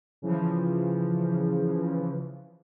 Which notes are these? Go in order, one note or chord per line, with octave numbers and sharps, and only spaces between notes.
C#3 E3 F3